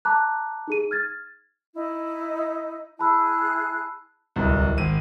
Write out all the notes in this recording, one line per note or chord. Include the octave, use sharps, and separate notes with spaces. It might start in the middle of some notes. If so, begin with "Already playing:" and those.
A5 A#5 D6 F#6
D#4 G#4 D#7
F6 G#6 A6
D#4 E4
E4 G#4 A5 B5 E6 F#6
D1 C2
G#1 D#7